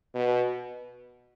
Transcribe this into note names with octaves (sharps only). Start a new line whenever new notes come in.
B2